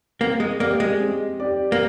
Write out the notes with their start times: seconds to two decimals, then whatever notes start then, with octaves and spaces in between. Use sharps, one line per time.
0.20 A#3 C4
0.40 G#3
0.60 A#3 D5
0.64 G4
0.80 G#3
1.00 C4
1.40 G4 D5
1.72 A#3